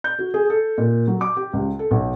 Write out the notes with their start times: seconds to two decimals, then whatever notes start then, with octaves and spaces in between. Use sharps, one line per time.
0.04 G6
0.19 F#4
0.34 G#4
0.50 A4
0.78 A#2
1.08 F#3
1.21 D6
1.37 G4
1.53 C#2
1.79 A4
1.91 B1